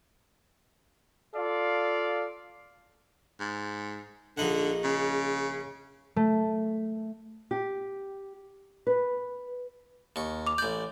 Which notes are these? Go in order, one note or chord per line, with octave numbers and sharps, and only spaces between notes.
F4 A4 D5 F5
G#2
A#1 D3 D#4 F#5
C#3
A3
G4
B4
D#2 C#6
D6 F7
A1 D5 G6